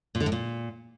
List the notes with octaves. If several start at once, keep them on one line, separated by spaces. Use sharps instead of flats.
A#2
D3
A2
A#2